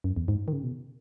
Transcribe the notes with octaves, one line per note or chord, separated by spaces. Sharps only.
F#2
E2
G#2
D#3
C#3
B2